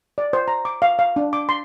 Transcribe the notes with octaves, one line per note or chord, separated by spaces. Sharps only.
D5
C5
A#5
D6
F5
F5
D4
D6
C6